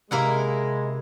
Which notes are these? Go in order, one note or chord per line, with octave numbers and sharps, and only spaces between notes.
C3 G#3 A#3 E4 F#5